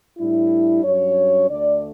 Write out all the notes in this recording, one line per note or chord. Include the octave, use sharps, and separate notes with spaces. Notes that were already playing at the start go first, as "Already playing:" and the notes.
A2 G3 D4 E4
G2 F#3 C#4 C#5
D2 D3 A3 D5